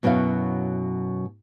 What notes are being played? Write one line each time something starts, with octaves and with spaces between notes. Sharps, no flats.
F#2 B2 F#3 E4 F5